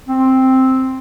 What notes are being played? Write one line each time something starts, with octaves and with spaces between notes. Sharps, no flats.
C4